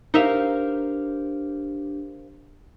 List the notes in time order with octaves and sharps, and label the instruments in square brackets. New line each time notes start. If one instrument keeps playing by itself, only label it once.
[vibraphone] D4 G4 [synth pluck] D#4 E5 [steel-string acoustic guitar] A#4 C5 F5